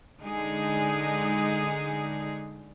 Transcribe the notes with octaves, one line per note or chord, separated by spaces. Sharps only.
D3 G#3 D#4 G#4